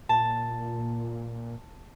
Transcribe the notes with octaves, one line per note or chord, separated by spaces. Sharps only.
A#2 A5